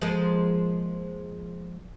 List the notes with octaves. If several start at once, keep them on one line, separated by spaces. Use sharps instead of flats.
F3 G#3 A#3